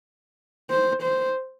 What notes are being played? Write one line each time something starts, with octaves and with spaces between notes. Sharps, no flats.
C5
C5